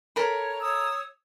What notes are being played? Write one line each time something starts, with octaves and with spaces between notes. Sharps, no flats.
A4 A#4 C#5 B5
C#5 D#6 E6